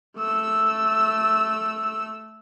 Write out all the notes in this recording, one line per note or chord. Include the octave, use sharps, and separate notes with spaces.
A3 E6